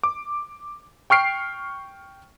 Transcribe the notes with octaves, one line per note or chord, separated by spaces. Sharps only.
D6
G5 C#6 F6 C7 D7